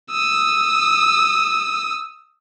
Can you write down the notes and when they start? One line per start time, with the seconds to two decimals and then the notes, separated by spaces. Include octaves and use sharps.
0.12 D#6 E6